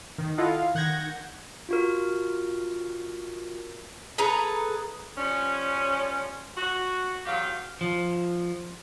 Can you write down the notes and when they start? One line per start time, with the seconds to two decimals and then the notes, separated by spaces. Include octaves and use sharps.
0.18 D#3
0.38 E4 F4 A4 D#5 F5 F#5
0.51 F5
0.75 D#3 F#5 G6 G#6 A#6
1.69 F4 F#4 A#4
4.18 G#4 A4 B4 A#5
5.17 F3 G3 C#4
6.57 F#4
7.26 E2 F#3 G4 F5
7.81 F3